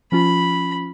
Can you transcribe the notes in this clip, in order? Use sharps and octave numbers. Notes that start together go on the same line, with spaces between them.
F3 C#4 F4 B5